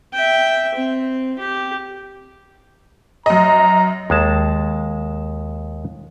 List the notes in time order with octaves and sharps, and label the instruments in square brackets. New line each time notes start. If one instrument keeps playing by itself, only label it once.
[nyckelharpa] E5 G5
C4
G4
[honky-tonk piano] F#2 D#5 [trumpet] A#5
[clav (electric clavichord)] D#2 G#3 A5